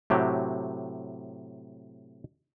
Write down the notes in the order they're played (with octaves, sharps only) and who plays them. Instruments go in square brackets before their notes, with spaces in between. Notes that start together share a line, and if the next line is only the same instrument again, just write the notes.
[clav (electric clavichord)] A2 C3 F#3 G4